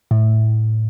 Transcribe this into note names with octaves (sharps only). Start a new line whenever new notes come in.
A2